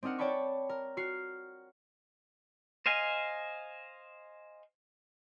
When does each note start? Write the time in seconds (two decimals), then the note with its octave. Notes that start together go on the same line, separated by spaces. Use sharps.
0.03 C4 D4 D#4 A#4 F#5
0.18 C#5 D5 G5 A5 B5 C#6
0.69 A#4
0.97 F#4 F6 C7
2.86 C5 D#5 F5 G#5